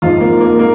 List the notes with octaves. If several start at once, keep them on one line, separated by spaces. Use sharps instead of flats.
G#1 G#2 F3 F4
A#3
A#3
A#3